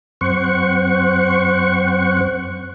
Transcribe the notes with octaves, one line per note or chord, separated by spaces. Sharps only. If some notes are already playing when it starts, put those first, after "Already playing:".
F#2 C4 C5 F#5 C#6